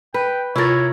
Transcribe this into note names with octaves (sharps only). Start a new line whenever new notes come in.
B4 G5
C3 E4 F4 A#4 C#5 A6